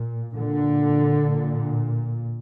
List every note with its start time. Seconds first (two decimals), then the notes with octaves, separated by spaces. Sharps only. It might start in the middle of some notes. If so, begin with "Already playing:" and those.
Already playing: A#2
0.35 A#2 D3
1.28 A#2